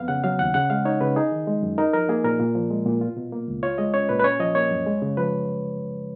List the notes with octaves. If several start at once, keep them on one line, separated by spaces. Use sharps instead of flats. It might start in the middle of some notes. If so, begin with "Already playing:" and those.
Already playing: F2 B3 F5
C#3 F#5
F#3 F5
D#2 F#5
C#3 F#5
G#3 F5
D#4 C#5
C#3 B4
D#4 G#4
D#3
G#3
F#2
D#4 A#4
F3 A#4
A#3 G#4
A#2 A#4
A#2
F3
G#3
A#2
F4
B2
A#3
C#2
F4 C#5
G#3 D#5
C#4 C#5
A#2 B4
B4
C#4 C#5
F3 D#5
A#3 C#5
F#2
G#3
C#3
F3 B4